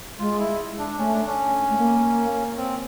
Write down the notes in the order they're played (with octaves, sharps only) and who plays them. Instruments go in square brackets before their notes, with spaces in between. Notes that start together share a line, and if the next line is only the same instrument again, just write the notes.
[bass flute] G#3 [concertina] F4
[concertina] E4
D4
[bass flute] A3 [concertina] C#4
[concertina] D4
C#4
[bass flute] A3
A#3
[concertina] C4